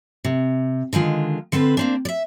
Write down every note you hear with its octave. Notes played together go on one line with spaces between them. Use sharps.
C3
D3 D#3 G#3 F4
D3 C4 A4 B4
A#3 C4 D4
D5 E5